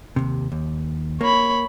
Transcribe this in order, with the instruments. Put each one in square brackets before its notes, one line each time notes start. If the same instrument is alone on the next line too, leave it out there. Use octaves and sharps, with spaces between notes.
[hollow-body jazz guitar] D#2 C3
D#2
[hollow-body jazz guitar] A#3 [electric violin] C#5 B5